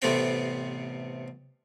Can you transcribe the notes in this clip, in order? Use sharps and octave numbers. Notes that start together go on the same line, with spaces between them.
A1 C3 A3 B3 C4 G5